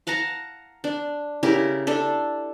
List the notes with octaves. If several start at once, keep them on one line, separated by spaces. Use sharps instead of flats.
F5 F#5 A5 A#5
D4
C#3 E4 G4 A#4
D4 A4